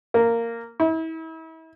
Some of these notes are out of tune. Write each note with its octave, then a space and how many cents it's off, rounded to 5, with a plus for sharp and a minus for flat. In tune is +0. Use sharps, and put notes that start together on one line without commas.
A#3 -10
E4 -35